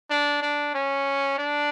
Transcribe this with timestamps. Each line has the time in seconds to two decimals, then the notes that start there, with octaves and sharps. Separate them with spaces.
0.11 D4
0.42 D4
0.75 C#4
1.39 D4